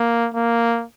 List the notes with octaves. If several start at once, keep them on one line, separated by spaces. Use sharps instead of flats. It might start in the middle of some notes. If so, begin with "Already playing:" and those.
Already playing: A#3
A#3